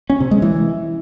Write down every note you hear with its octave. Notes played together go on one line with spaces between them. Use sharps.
C#4
C3
G#3
E3